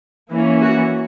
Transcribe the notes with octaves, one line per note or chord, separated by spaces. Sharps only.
E3 A#3 C#4
F#4